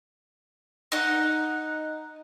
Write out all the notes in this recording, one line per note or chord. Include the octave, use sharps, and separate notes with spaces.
D#4 F#5